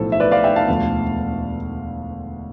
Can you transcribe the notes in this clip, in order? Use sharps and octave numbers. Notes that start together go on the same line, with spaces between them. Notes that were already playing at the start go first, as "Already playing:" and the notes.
Already playing: B1 A2 F3 A4 C5
E5
B4 D5
D5 F5
E5 G5
F5 A5
E1 D2 D3 F3